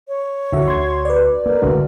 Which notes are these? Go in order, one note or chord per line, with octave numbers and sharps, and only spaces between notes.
C#5
D#2 D3 F#4 A4 E5
D2 C6 G#6
B4 D5
A#3 A#4
F#1 C#2 B2 D3 A3 F#4